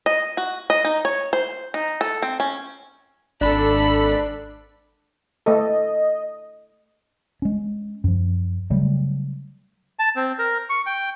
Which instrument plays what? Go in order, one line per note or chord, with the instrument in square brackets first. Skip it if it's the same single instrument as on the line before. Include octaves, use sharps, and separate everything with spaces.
[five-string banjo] D#5
F#4
D#5
D#4
C#5
C5
D#4
A4
C4
C#4
[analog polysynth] G#1 A4 [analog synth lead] D4 [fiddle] B5
[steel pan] A3 A4 [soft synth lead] D#5
[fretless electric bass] G#3 C#4
F#2 F3
C#3 F#3 G3 A3
[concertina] A5
C4
A#4
C#6
G5